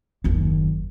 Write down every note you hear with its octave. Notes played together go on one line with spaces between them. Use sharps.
F#1 D#2